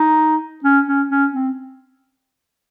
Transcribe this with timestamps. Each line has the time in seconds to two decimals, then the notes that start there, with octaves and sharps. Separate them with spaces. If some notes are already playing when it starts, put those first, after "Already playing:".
Already playing: D#4
0.64 C#4
0.87 C#4
1.10 C#4
1.33 C4